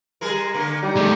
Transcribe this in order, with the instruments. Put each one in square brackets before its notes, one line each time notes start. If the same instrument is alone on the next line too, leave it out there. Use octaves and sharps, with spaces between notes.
[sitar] G3 G#4 A#4
D3 A#3
[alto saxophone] G3 [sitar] D#4
[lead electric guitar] G#3 A3